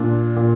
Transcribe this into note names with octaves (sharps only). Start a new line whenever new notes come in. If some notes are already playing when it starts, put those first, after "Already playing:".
Already playing: A#2 D4
A#2